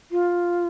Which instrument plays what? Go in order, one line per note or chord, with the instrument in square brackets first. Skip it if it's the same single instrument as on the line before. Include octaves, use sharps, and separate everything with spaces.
[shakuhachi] F4